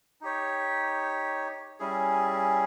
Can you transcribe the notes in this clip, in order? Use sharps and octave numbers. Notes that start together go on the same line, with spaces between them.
D#4 G4 C#5
G3 C#4 E4 G#4